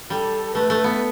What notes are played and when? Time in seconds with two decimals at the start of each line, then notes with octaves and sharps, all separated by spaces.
0.10 G3 A4
0.55 A3 B4
0.70 A3
0.84 B3